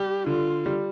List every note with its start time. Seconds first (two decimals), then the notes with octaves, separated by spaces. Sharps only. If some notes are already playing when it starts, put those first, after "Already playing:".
Already playing: G3 G4
0.26 D3 F4
0.66 G3